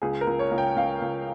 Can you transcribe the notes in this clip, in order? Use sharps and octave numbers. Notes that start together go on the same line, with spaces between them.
C#2 G#4
A#4
C#2
C#5
C#2
G5
C#2 F5
C#2